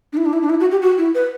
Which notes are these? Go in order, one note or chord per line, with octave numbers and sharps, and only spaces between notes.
D4
E4
D4
E4
D4
E4
F#4
G4
F#4
E4
B4